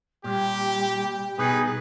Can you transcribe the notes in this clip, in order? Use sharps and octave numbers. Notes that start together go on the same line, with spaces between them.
A#2 G3 G4
B2 D#4 G#4 B4